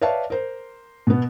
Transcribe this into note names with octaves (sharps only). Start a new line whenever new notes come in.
B4 C#5 D5 E5 F5 A5
A#4 C5
B2 B3